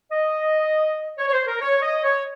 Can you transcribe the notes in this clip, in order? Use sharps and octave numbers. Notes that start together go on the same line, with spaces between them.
D#5
C#5
C#5
C5
A#4
C#5
D#5
C#5